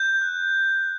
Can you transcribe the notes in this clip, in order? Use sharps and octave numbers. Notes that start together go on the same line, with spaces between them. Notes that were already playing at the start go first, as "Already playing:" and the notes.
Already playing: G6
F#6